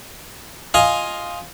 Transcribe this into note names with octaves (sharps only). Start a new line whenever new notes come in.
F4 D#5 F5 G#5